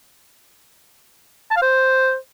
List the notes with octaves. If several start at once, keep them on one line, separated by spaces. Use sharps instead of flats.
A5
F5
C5